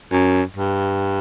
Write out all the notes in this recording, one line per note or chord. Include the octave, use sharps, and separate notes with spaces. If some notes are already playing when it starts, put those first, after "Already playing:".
F#2
G2